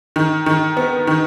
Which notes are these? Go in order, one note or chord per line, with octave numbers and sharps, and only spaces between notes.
D#3
D#3
B3
D#3